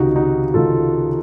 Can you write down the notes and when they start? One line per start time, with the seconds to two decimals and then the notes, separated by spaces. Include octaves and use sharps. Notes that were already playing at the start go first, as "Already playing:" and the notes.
Already playing: C#2 C3 D#3 D#4 F#4
0.16 D#4 F#4
0.54 C#2 C3 D#3 F4 A4